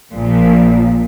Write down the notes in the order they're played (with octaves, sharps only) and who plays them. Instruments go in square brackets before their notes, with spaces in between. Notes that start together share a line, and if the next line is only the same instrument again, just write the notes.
[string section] A#1 A#2 F3